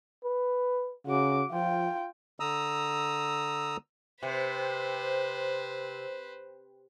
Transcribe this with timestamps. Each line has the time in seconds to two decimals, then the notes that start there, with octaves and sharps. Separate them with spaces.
0.24 B4
1.07 C#3 F#4 D6
1.51 F3 F4 G5
2.40 D3 A#5 D#6 E6
4.23 C3 B4 C5